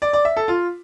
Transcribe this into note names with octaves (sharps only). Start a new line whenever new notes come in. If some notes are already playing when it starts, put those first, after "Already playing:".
D5
D5
E5
A4
F4